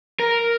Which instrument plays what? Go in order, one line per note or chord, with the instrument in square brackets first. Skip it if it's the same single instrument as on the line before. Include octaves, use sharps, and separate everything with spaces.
[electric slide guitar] A#4